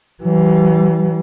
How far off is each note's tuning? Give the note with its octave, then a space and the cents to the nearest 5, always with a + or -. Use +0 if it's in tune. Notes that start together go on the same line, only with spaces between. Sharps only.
E3 +0 G3 -45